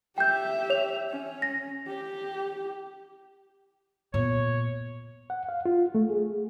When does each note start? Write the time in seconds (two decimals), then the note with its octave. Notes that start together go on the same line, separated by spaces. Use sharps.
0.18 G4 E5 G5 G6
0.70 C#5 F7
1.10 C#4
1.42 A#6
1.88 G4
4.14 A#2 B3 C#5
5.30 F#5
5.49 F5
5.65 F4
5.95 A3
6.09 G#4